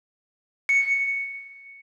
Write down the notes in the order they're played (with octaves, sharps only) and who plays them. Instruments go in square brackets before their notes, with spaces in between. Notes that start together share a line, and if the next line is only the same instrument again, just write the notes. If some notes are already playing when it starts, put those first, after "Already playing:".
[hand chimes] C#7